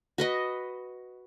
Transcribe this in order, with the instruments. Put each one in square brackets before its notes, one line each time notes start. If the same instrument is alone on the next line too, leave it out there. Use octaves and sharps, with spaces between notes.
[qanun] F#4 B4 D#5